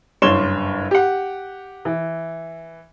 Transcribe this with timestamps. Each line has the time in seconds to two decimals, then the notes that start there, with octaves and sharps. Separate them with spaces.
0.22 F#1 G2 C#5 C6 E7 G7
0.91 G4 F#5
1.85 E3